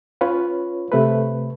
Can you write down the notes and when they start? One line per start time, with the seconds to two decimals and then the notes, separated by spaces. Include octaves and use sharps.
0.21 C#4 F4 B4 C#5
0.92 C3 A3 A4 B4